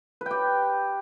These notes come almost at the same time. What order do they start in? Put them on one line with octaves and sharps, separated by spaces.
B4 G5 G4